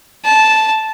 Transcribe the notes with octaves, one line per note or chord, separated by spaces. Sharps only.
A5